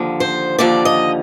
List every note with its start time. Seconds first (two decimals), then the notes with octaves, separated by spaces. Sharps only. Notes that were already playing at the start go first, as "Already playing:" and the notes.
Already playing: D#2 D3 F3
0.20 C5
0.59 D#2 D3 F3 D5
0.85 D#5